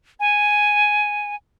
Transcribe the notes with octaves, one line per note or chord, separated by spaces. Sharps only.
G#5